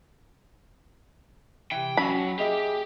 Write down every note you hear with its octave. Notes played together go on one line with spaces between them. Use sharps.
C3 E3 G5
F#3 C#4 B5
A#3 G4 G#4 D#5 E5